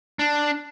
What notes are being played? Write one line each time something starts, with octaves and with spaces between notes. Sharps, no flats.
D4